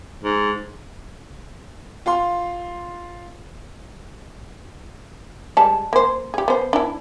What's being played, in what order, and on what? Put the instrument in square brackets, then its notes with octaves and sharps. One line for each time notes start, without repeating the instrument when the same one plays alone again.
[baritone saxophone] G#2
[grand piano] F4 F5 C6
[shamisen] G3 G#3 A5
A#3 C5
G4 G#4
B3 C5
D4 E4